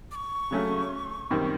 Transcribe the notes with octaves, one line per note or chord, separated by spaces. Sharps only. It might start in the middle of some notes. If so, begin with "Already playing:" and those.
D6
C#6
C#3 F#3 A3 C#4
F#2 D#3 G3 C4